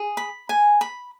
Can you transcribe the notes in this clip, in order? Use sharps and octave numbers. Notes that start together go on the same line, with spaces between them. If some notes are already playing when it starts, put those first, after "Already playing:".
Already playing: G#4
B5
G#5
B5